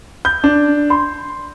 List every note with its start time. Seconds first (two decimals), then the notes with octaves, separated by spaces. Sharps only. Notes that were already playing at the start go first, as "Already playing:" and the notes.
0.25 G6
0.44 D4
0.90 C6